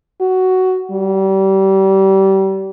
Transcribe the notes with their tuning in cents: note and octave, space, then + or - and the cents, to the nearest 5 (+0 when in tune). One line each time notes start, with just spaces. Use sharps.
F#4 +10
G3 -30